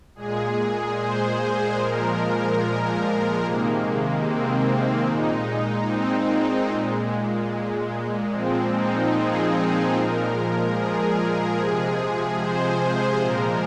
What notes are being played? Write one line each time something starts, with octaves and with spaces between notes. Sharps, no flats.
A#2 G#3 G#4
C5
A#2 F3 G#3 A#4
A#4
C3 D#3 G#3 A#3
C4
A#2 G#3 D#4
C4
A#2 G#3
A#2 F3 G#3 C4
D#4
G#4
A#2 F3 G#3 A#4
G#4
C3 F3 G#3 G#4
C5
A#2 F3 G#3 A#4